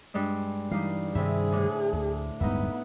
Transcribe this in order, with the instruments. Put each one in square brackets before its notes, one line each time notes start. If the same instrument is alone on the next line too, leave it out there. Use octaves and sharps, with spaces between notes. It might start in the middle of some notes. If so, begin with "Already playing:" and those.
[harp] G2 G#3
[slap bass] E3 [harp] G3 D#4 F5
[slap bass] G2 D#3 G3 [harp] C3 E4 [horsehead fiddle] G#4
[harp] A2 D3
[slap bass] D2
[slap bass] D1 G2 G#3 [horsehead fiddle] B3 [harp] D#4 E4